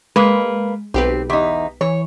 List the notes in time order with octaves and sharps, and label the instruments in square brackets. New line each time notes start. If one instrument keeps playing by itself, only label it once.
[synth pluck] G#3 [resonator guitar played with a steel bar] A#3 B4
[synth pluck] B1 G4 B4 [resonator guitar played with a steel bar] C4
[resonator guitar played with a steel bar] E2 D#4 [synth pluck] B6
[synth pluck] E3 [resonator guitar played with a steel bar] C#5